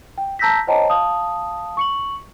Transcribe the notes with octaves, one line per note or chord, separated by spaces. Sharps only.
G5
A5 A#5 E6 G6 A#6 B6
C5 C#5 D#5 G5 A5 A#5
F5 A5 D#6
C#6 C#7 F#7